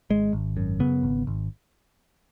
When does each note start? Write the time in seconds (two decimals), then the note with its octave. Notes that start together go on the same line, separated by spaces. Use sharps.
0.10 G#1 G#3
0.33 G#1
0.57 F#2
0.80 C#3 B3
1.03 G#1
1.27 G#1